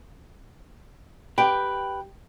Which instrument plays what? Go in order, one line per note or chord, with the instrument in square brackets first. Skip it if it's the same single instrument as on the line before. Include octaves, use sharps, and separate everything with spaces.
[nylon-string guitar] G4 G5 [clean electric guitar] B4